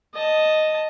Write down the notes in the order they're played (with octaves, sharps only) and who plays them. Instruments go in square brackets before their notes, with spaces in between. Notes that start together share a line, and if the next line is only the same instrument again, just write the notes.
[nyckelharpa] D#5 A5